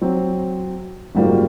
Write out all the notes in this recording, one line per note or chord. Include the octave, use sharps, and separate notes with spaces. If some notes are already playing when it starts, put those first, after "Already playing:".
F#3 C4
F#1 G#2 G3 A#3 F4 F#4